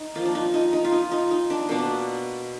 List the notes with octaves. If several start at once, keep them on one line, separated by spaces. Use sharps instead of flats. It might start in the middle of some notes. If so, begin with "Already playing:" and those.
Already playing: D#4
F3 A#3 F4
D4
D#4
D#4
D#4
F4
D#4
D#4
D#4
D4
B2 A#3 D4